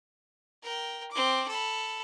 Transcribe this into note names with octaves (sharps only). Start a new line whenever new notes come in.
A#4 G5
C4 D6
A4 B5